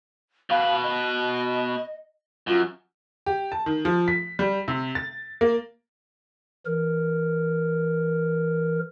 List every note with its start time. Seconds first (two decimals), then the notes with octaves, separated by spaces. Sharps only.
0.50 B2 B4 F5
0.83 D#5
2.47 F#2 F4
3.26 G4
3.52 A5
3.66 D#3
3.85 F3
4.08 B6
4.39 G3
4.68 C3
4.95 A6
5.41 A#3
6.66 E3 A#4